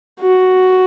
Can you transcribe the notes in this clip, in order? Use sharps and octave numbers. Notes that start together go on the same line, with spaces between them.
F#4